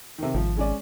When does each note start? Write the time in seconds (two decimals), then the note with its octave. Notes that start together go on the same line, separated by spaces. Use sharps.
0.18 C3 D#3
0.34 G#1 F3
0.57 G#3 C#4 D5